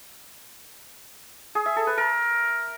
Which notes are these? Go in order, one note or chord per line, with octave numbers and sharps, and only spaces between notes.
G#4
E5
A4
B4
A#4